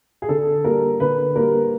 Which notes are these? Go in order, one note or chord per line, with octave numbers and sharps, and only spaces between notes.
G#4
D3 A4
G3 A#3 A#4
D3 B4
G3 A#3 A#4